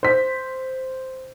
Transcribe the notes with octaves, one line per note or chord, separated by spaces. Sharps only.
C5 B6